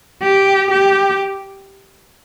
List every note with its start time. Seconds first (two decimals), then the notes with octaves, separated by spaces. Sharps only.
0.23 G4
0.71 G4